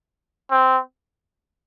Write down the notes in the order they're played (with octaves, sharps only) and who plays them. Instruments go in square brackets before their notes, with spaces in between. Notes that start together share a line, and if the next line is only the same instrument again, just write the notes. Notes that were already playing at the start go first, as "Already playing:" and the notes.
[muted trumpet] C4